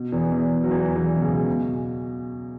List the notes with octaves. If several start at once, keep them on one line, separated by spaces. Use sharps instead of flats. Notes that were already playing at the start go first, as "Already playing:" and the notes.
Already playing: B2
E2 E3
E2 E3
F#3
E2 E3
E2 E3
B2
C#2 C#3
B2